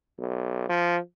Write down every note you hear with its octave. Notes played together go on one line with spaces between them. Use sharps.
B1
F3